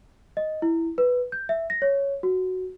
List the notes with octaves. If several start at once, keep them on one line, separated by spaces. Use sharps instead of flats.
D#5
E4
B4
G6
E5
A#6
C#5
F#4